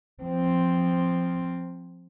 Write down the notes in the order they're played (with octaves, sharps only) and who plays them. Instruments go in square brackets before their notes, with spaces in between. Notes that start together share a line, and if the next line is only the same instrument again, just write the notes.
[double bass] F3 C4